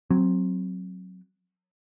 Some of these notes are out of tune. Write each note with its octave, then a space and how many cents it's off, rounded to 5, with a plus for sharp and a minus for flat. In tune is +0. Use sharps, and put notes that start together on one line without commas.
F#3 +0 C4 +10